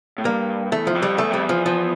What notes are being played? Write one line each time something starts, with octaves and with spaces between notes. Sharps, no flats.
A2
G2 A#3
E2 A3
F3
F2
G3
E2 A3
F2 G3
E2
F3
F3